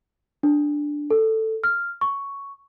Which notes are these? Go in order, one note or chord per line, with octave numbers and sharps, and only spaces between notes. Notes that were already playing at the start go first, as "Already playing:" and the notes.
D4
A4
F6
C#6